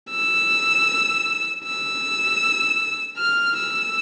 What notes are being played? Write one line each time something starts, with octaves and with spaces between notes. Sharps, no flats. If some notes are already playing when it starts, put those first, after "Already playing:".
E6
E6
F6
E6